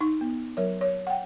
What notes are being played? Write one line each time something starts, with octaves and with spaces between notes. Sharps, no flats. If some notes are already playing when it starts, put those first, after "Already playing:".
D#4 C#6
B3
F#3 A#4 C#5
C#5
F#5 G5